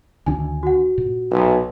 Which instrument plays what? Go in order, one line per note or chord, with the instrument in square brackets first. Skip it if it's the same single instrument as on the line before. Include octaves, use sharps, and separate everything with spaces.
[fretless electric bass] D2 D#3 D4 [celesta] G#5
[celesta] F#4 F#5
[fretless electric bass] A#2
[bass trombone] B1